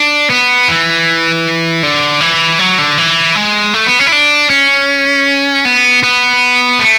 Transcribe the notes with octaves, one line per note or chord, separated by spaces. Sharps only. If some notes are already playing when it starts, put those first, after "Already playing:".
Already playing: D4
B3
E3
D3
E3
F#3
D3
E3
G#3
A3
B3
C#4
E4
D4
C#4
B3
B3
A3